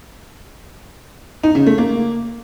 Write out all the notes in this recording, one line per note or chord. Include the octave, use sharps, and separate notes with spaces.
D#4
C#3
A3
A#3